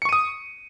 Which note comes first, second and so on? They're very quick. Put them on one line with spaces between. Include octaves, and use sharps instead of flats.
C#7 C#6 D#7 D#6